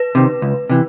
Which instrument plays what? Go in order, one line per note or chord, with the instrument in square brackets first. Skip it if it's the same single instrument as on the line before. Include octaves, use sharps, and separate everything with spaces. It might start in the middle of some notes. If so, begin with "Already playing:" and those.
Already playing: [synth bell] B4
[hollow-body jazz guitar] C3 D#3
C#2
C3 E3